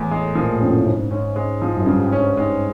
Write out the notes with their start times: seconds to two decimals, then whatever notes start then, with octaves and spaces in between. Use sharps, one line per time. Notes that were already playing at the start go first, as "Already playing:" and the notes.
Already playing: E2 A2
0.11 G#3
0.35 A#2 F3
0.53 A2
0.62 F2 C#3
0.70 F#2
0.86 G#2 C#3
1.11 G#2 C#4
1.36 G#3
1.62 F3
1.77 F#2
1.86 G2 C#3
1.98 G#2
2.03 G2
2.12 C#4
2.20 G#2
2.37 G#2 G#3